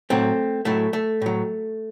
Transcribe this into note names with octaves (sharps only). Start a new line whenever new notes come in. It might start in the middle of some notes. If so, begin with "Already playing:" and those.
A2 F#3 A3 C4
A2 F#3 A3
A3
A2 F#3